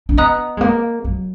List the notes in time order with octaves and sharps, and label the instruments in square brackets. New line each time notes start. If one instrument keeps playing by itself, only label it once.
[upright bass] D4
[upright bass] B3 [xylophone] D#5 A#5 D#6 F#6
[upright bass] G#3
A#3
F#3